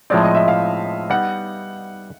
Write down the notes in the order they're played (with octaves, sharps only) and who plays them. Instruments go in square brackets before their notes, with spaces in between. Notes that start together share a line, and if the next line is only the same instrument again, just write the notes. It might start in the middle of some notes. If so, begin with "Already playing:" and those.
[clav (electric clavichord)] A2 F3 G#3 C4 [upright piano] D5
[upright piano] D#5
E5
F5
[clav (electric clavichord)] G3 B3 D#4 [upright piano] F#5